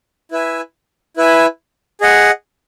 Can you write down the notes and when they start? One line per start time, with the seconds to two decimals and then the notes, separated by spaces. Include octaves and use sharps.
0.31 E4 B4 E5 G#5
1.17 E4 B4 E5 G#5
2.01 G#4 D#5 F#5